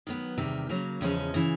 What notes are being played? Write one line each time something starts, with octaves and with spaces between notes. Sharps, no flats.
D#3 F#3 B3
E2 C3 D#3 G3
C#3 F#3 A#3
E2 C#3 F3 G#3 C#4
C#3 E3